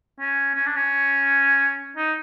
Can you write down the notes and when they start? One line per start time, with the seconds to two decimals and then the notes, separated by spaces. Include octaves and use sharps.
0.21 C#4
0.55 C#4
0.66 D4
0.76 C#4
1.97 D#4